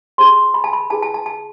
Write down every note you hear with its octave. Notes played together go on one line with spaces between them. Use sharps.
F4 G#4 C5 C6
B5
A5
B5
E4 G#4 B4 A5
A5
A5
A5